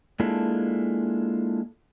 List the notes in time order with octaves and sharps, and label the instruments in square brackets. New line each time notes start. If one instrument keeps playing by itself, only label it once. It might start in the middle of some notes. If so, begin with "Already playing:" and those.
[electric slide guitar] G#3 A#3 D4 E4 F4 A4